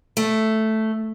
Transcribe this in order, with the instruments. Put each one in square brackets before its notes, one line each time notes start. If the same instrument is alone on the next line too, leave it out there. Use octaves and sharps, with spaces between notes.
[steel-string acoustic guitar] A3